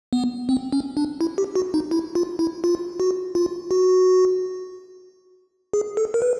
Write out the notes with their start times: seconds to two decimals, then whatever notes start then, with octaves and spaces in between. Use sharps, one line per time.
0.13 B3
0.49 C4
0.72 C#4
0.97 D4
1.21 E4
1.38 G4
1.56 F#4
1.74 D#4
1.91 E4
2.15 F4
2.39 E4
2.64 F4
3.00 F#4
3.35 F4
3.71 F#4
5.73 G#4
5.97 A4
6.14 A#4
6.22 B4